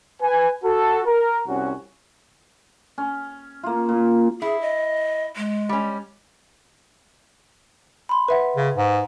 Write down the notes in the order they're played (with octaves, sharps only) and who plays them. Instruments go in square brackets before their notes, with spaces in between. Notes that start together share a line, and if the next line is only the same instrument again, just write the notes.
[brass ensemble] B4 G#5
F#4 A4
A#4
C2 C#4 F#4
[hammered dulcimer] C#4
A#3 F4
A#2
[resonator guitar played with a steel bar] E4 [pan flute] G#4
[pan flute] D#5
G#3
[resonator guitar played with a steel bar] G3 C#4
[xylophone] B5 C6
B4 E5 F#5
[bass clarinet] C#3
G#2